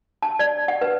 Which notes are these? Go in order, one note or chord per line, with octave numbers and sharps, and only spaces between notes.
A5
D5
F#5
B4